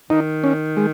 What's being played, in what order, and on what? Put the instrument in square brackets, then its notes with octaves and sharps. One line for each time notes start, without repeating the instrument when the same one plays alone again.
[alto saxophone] D#3 [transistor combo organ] D#4
[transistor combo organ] C#4
G#3